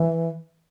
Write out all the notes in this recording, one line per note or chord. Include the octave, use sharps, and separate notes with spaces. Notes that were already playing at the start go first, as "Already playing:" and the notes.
Already playing: E3